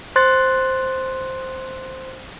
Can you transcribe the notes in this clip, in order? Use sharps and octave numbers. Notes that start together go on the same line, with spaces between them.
C5 C6 F#6 A6